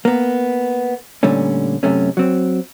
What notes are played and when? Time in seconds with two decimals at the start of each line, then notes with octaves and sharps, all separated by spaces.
0.05 A#3 B3
1.23 A#2 D3 G3 A3 C#4
1.83 F#2 C3 A3 C#4
2.17 F#3 C4